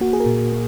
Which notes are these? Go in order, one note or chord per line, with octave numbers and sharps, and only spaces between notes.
A#3 F#4
G#4
A#4
A#2
A#3